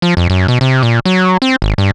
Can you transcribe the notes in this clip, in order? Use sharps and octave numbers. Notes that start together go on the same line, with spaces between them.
F3
F2
F#2
B2
C3
A#2
F#3
C4
G#1
G2